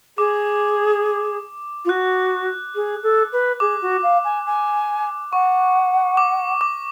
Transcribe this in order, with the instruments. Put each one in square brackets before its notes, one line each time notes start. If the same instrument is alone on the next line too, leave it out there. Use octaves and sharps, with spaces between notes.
[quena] G#4 [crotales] D6
[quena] F4
[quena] F#4 [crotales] F#6
[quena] G#4
A4
B4
[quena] G#4 [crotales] D6
[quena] F#4
F5
G#5
G#5
[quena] F#5 [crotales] C#6
[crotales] D6
D6